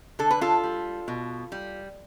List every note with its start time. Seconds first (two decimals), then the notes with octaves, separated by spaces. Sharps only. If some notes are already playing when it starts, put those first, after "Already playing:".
0.19 D3 A4
0.31 B4
0.41 F4 A4
0.63 G3
1.08 B2
1.52 G3